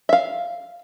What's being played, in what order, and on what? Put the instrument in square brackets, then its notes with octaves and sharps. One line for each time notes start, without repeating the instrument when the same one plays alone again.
[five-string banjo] E5 F5